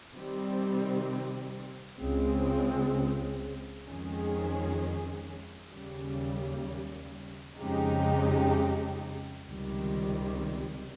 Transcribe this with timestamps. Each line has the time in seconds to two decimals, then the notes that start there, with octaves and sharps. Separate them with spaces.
0.13 C3 D#3 G3 C4
1.99 C#2 C#3 G#3 C4
3.87 F2 D#3 G#3 C#4 G#4
5.73 D#2 C#3 G3
7.60 F2 C#3 G#3 D#4 G4
9.47 C#2 C3 D#3 G3